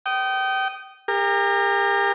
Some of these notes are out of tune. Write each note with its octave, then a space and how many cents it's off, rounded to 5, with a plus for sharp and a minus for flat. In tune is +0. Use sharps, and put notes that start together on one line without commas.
G5 -30 D#6 -5
G4 +40 A#4 -15